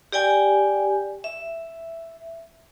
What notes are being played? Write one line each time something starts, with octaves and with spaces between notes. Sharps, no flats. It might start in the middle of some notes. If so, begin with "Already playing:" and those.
G4 D5 G5 G#5
E5